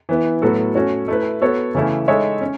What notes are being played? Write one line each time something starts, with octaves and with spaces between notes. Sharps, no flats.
E3 B3 E4
A2 F#3 B3 F#4 A4
A3 C#4 F#4 C#5
A3 E4 B4
B3 F#4 A4 C#5
C#3 E3 A3 C#4 E4
G#3 D#4 A4 C#5 E5
C#4